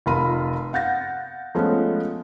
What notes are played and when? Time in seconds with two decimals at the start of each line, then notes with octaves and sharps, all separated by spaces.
0.06 F1 F4 A#4 B5 D#7
0.73 F5 F#5 G6 A6 A#6
1.55 F3 G#3 A3 B3 C#4